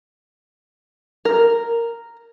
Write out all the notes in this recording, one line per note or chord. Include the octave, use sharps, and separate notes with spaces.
A#4